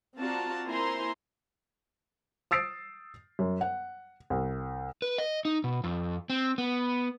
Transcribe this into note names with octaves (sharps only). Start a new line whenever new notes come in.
C4 F4 F#4 D5 A5 A#5
A#3 E4 C5 G#5 A#5 C6
D#6 E6 A6 C7 D7
F#2
F#5
C2
B4
D#5
D#4
B2
F2
C4
B3